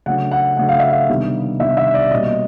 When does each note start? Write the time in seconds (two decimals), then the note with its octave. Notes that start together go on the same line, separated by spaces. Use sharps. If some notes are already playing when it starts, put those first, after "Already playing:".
0.06 C#3 F#3 A3 D4 F#5
0.31 F#5
0.57 C#3 F#3 A3 D4 F#5
0.69 F5
0.80 E5
0.90 F5
1.09 C3 D#3 G3 B3 D4
1.60 C3 D#3 G3 B3 D4 E5
1.77 E5
1.94 D5
2.11 B2 G3 A#3 C#4 D#5